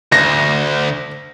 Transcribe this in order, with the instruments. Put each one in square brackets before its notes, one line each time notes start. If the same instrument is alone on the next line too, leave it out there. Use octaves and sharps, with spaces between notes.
[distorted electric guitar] D2 [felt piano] A#6